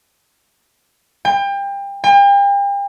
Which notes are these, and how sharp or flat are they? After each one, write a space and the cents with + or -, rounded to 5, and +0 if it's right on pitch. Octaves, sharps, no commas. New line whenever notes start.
G5 +30
G5 +40